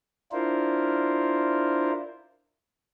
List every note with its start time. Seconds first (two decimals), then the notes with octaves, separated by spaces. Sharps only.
0.32 D4 E4 F4 A#4 C5